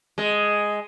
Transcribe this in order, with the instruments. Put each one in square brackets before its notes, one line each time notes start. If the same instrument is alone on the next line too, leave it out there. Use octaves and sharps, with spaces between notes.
[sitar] G#3 D#5